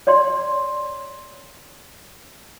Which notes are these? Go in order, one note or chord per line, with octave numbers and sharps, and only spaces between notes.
C#5 D5 C6